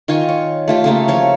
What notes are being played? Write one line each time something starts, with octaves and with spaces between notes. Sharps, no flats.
D#3 F4 G#5 C#6
C#5
A3 F4 G4
C#3 A3 A#3
F3 C#5 F5